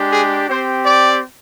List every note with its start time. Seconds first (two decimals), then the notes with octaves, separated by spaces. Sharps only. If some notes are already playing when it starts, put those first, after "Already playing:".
Already playing: G#3 D4 G4
0.11 G#4
0.48 C4 G4 C5
0.86 D5